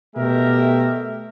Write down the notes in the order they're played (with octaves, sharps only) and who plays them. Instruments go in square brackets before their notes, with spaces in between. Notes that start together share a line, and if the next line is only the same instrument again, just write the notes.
[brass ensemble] B2 A3 G4 A#4 E5